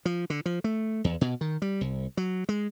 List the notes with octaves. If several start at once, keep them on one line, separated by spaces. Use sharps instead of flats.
F3
D3
F3
A3
E2
B2
D#3
G3
C2
F#3
G#3